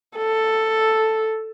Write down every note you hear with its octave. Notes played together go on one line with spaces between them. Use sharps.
A4